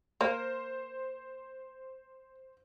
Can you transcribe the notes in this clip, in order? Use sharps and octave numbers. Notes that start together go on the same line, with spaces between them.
A#3 C5